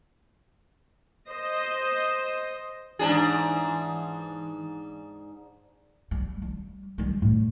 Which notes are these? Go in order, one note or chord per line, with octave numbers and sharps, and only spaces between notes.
C5 D#5
G#2 E3 D4 G#4
G3
G3
G3 G#3
A2